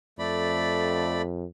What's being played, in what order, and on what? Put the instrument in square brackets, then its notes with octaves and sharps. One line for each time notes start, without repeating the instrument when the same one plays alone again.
[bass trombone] F2 [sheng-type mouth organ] A3 D5 B5